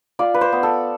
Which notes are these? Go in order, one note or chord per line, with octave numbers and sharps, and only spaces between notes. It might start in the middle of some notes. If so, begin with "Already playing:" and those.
F4 D5
B4
C5
B3
A4